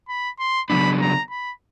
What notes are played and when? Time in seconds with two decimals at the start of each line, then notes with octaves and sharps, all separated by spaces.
0.08 B5
0.39 C6
0.69 C#3 F#3 B3 D4 B5
1.01 A#5
1.31 B5